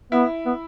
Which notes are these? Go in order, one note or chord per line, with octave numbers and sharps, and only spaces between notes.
B3 E4
B3